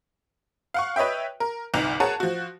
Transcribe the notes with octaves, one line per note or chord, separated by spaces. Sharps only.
F5 F#5 C#6
B4 C#5 D#5 E5 G5
A#4
G1 C2 D#4 F7
G#4 A#4 C#5 F#5 A5
F3 F#4